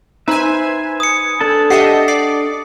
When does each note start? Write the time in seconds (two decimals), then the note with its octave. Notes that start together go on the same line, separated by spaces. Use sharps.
0.28 D#4 B4 C5 E5 G#5
1.00 D#6 C#7
1.41 D4 A4 A5
1.70 G4 D#5 E5 F#5 C7 C#7
2.08 D5 C7